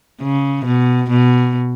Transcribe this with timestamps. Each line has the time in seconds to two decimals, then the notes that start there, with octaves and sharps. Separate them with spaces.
0.21 C#3
0.65 B2
1.10 B2